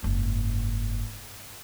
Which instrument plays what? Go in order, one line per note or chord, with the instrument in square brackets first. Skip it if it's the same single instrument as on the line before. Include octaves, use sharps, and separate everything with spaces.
[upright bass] F#1 G#2